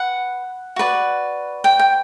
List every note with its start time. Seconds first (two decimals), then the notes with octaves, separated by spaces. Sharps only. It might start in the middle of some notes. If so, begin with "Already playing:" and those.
Already playing: B4 F#5
0.76 F#4 B4 D5
1.64 G5
1.79 G5